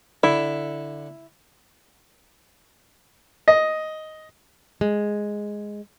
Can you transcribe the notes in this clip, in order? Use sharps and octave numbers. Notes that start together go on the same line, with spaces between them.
D3 E4
D#5
G#3